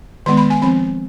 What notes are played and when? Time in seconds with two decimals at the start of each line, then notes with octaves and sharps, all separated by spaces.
0.26 D#3 G#3 B3 C6
0.37 B5
0.50 G#5
0.62 F3 C4 B5